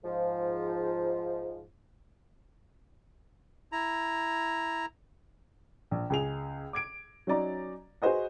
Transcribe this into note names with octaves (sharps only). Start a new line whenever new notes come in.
G#2 F3
E4 A#5
A#1
C#2 G#4 F7
D6 G#6 D7
F#3 C#4 D#4 D5 A#5
F#4 G#4 B4 C5 D#5 F#5